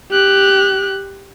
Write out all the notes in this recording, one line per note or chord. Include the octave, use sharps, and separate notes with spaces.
G4 F#6